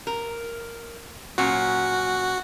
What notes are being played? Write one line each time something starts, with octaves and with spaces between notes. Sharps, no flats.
A#4
A#2 F#3 C#4 F#4